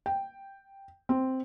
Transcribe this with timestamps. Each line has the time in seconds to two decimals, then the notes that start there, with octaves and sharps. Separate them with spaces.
0.06 G5
1.09 C4